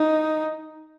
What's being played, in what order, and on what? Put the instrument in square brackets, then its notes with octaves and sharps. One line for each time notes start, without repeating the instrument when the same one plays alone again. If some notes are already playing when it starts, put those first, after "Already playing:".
Already playing: [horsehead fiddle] D#4